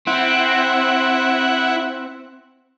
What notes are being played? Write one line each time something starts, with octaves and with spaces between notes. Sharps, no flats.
C4 E4 F#5